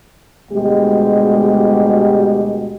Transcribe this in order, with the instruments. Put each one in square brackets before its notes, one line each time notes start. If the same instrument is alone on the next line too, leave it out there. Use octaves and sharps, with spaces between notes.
[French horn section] D2 B2 G3 G#3 G4